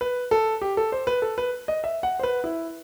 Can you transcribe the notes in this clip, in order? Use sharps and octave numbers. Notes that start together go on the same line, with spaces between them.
B4
A4
G4
A4
C5
B4
A4
B4
D#5
E5
F#5
C5
B4
E4